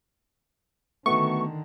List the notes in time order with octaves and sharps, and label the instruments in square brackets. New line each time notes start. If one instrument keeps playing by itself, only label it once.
[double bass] D3 D#3 [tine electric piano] A3 B3 F#4 [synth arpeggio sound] C#6